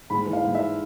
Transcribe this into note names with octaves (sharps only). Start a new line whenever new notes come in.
G#2 B5
E3
F5
G#2
E5